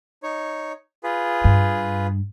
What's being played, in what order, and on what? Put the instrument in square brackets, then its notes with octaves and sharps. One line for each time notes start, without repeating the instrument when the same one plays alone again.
[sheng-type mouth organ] D#4 C#5
F4 G#4 B4
[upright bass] G2